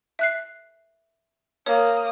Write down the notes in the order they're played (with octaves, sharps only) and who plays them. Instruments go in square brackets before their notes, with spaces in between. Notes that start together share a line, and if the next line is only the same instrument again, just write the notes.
[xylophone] E5 F#6 C7
[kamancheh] A#3 D#6 [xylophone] C#5